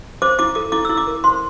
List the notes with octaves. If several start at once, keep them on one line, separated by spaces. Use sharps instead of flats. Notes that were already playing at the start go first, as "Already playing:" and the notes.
C5 D6
E4 D6
A4 D6
E4 D6
E4 E6
D6
A#4
C5 C6